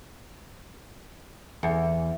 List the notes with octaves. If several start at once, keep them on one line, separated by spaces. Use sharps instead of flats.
E2